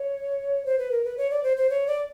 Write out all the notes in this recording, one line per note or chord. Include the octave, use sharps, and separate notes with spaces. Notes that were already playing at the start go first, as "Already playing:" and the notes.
Already playing: C#5
C5
B4
A#4
B4
C#5
D5
C5
C5
C#5
D5